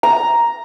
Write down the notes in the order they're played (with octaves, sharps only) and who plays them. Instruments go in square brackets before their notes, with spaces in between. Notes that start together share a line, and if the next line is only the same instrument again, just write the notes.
[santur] A#5